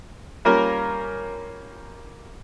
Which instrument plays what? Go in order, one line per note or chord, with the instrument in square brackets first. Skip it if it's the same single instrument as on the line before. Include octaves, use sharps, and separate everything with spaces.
[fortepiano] G3 A#3 C#4 F4 A#4